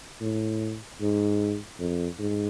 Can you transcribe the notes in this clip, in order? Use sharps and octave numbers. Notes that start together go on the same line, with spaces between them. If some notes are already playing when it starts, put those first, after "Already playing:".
A2
G#2
F2
G#2